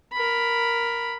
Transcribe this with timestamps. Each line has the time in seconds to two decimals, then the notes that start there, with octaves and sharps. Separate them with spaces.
0.13 A#4 B5